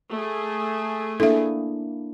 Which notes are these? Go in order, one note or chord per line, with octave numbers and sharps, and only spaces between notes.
A3 G#4
A#3 D4 E4 A4 E5